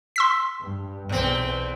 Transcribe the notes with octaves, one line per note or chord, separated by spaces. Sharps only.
C6 E6 B6
G2
B1 E2 C4